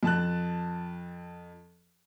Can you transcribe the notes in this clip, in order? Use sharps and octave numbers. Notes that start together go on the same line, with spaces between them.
F2 A5 F#6